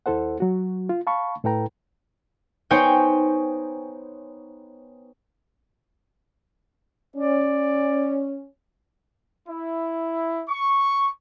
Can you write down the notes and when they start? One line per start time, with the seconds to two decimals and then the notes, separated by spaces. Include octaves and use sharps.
0.06 D#2 E4 A4 C5 F#5
0.40 F#3 F#4
0.89 F4
1.07 F5 A5 B5 C#6
1.44 A2 E4 A4 B4 G5 A#5
2.70 B3 D#4 C5 C#5 G5 G#5
7.16 C#4 D5
9.48 E4
10.49 C#6